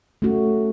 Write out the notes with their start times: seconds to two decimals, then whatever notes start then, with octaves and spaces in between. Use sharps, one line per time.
0.22 A3 C#4 F#4